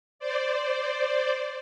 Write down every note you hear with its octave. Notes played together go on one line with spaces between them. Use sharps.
C5 D5